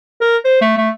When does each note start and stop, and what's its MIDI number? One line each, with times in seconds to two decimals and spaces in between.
0.21 0.37 70
0.45 0.58 72
0.61 0.73 57
0.78 0.89 57